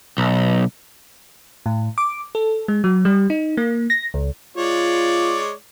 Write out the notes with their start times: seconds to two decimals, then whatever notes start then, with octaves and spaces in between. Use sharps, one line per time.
0.18 B1
1.66 A2
1.98 D6
2.35 A4
2.68 G#3
2.84 F#3
3.05 G3
3.30 D#4
3.57 A#3
3.90 A#6
4.14 C#2
4.57 G#3 F4 C#5 D5